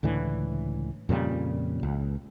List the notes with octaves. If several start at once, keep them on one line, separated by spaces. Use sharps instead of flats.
C#2 A2 D3 E3
F2 A#2 C#3 G3
C#2